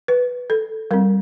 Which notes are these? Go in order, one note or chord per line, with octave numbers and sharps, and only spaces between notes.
B4
A4
G3 C4 A#4